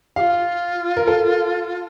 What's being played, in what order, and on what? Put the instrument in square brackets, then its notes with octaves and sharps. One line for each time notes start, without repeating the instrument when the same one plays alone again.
[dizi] G4 [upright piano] F5
[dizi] F4
[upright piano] A#4
A4